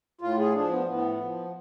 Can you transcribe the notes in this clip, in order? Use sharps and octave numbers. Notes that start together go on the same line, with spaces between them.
A2 F4
G#4
F3 D4
B3
A2 B3
F3